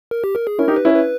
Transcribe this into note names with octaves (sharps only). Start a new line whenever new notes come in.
A#4
G4
A#4
G#4
C#4 E4 A#4
D#4 G4
B4
C#4 E4
B4